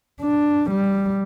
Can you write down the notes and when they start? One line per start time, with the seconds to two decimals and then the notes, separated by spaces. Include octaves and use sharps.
0.21 D4
0.70 G3